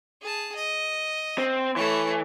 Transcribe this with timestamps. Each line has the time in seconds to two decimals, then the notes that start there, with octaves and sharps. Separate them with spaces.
0.22 G#4 A5
0.55 D#5
1.38 C4
1.76 E3 A3 C#5